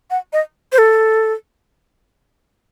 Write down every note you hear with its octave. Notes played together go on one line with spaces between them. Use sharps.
F#5
D#5
C5
A4